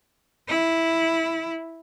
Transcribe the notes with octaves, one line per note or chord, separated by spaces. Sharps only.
E4